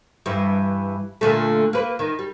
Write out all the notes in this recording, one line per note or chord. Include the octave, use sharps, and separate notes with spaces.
G2 E3
A#2 D3 A3
A#3 B4
D#3
G3